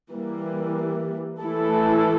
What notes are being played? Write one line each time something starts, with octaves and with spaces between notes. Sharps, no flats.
E3 G3 A#3
E3 A3 E4 A4